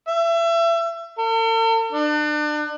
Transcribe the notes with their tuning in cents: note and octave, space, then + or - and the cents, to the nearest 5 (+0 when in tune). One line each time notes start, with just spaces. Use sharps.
E5 +30
A4 +45
D4 +35